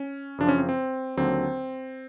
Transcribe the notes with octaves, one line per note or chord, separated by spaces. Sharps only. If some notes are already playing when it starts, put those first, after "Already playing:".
Already playing: C#4
F#2 C#3 F3 D4
C#4
C4
C4
D#2 D3 F#3 C4